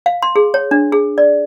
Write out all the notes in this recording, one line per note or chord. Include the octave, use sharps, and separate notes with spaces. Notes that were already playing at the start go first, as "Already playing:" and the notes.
F5
C6
G#4
C#5
D4
G#4
D5